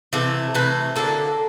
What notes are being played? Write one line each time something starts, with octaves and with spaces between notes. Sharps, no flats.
C3 E3 A3
C3 E3 A3 B4
D3 F#3 A#3 A4